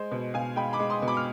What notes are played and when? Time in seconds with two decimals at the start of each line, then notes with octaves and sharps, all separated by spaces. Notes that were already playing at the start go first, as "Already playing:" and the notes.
Already playing: G#3 C5
0.11 B2
0.34 B2 F5 G#5
0.56 G#3 G5 B5
0.73 B5 D6
0.79 G#3
0.90 C6 D#6
1.02 B2
1.08 B5 D6
1.17 F6